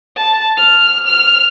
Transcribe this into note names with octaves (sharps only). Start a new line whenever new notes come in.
A5
F6
F6